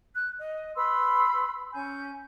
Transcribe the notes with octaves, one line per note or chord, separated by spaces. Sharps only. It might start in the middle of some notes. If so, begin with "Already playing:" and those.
F#6
D#5
B4 B5 C6 E6
C#4 G#5 G6